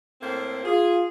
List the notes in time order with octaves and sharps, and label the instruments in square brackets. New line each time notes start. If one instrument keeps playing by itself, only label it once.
[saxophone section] A2 A#3 C4
[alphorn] F4 [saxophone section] G#4